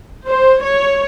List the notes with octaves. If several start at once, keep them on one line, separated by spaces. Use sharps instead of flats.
C5
C#5